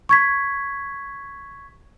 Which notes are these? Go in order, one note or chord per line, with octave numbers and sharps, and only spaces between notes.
C#6 G#6 B6